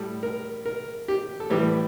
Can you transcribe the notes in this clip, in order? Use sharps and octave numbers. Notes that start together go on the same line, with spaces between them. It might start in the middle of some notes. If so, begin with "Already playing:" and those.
Already playing: A2 G3 A4
A#4
A#4
G4
A4
A2 E3 G3 G4